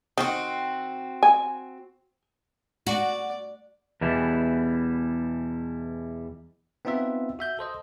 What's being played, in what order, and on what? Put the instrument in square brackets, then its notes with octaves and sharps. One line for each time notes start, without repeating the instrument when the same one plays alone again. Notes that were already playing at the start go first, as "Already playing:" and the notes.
[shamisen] D#3 [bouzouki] C4 F#4
[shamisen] G#5
[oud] F#4 [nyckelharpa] D5
[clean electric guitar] E2 B2 E3 G3 E4
[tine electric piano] B3 C4 D#4 F4 B4 E5
F#4 E5 G6
A4 C5 D#5